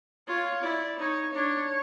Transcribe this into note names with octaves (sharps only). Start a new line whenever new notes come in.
F4 C#5
E4 D5
D#4 C#5
D4 C#5